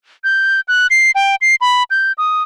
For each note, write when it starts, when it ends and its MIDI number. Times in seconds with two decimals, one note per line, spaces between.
0.24 0.61 91
0.68 0.87 90
0.91 1.11 96
1.15 1.36 79
1.41 1.55 96
1.61 1.83 83
1.90 2.12 91
2.18 2.43 87